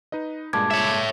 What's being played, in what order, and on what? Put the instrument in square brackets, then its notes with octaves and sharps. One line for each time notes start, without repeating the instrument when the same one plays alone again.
[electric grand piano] D#4 B4 D#5
[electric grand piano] G2 A#2 G#3 [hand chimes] A5 D6 G#6
[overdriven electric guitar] C#5 E5